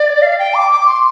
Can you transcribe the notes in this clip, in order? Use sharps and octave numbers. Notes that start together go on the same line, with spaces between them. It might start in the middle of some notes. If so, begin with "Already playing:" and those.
Already playing: D5
F5
G5
D6
D6
C6